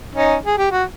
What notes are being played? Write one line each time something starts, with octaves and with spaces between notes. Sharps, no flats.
C#4 D#4
G#4
G4
F#4